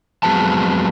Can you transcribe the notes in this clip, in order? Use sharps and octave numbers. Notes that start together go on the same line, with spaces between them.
F2 F#3 G#3 B3 C4 A5